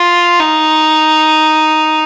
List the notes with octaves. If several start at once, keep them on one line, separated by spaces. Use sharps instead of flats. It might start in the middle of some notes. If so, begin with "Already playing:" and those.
Already playing: F4
D#4